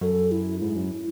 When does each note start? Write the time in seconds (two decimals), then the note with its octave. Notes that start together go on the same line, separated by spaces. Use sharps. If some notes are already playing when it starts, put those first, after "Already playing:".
0.01 F#2 A4
0.31 E4
0.61 G#2 E4
0.76 F#2